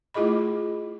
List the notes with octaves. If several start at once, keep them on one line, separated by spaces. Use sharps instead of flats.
A3 E4 F4 G#4 D#5 B5